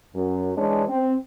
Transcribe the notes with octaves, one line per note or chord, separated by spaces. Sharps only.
F#2
E3 G#3 D4 C#5
C4